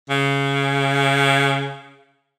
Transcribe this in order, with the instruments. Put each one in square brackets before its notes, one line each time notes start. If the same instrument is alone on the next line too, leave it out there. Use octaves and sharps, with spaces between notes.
[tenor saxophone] C#3